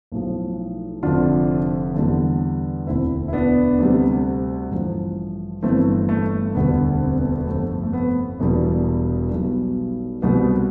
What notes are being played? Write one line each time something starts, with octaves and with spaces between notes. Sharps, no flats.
B1 A2 F3
F1 F2 D3 D4 F4
E2 D3 G3
E1 D2 D3 C4 E4
E4
B3 D4
D2 C3 G3
A1 G2 F3
G1 G2 E3 A3 C4
A3
E1 D2 D3 G3 B3
C4
B3
A3
B3
G1 F2 C3 A3
A3
B3
E1 E2 B2 G3
B1 B2 G3
C2 B2 G3 B3